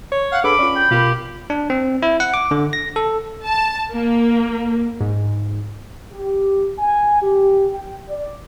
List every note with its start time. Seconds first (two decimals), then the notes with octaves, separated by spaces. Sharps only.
0.12 C#5
0.32 F5 F#5
0.44 D4 G#4 A4 B4 B5 D6
0.59 C#4 F4 D5
0.76 G5
0.91 B2 F4 G4 A#4
1.50 D4
1.70 C4
2.02 E4
2.20 F#5
2.34 D6
2.51 D3
2.73 A#6
2.96 A4
3.44 A5
3.92 A#3
5.01 G#2
6.13 G4
6.79 G#5
7.22 G4
7.74 G5
8.09 D5